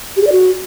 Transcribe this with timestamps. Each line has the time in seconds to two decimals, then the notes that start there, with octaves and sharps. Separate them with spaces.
0.17 G4
0.22 G#4
0.27 D5
0.32 F#4